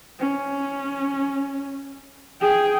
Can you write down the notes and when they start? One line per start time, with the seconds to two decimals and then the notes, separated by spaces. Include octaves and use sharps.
0.20 C#4
2.41 G#4 G5